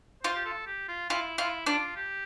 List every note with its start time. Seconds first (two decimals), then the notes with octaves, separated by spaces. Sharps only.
0.23 F4 C5
0.35 G4
0.45 A4
0.66 G4
0.88 F4
1.10 E4 F4
1.38 E4 F4
1.67 D4 F4
1.96 G4